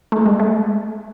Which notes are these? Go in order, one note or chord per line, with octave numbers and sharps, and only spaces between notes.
A3
G#3
A3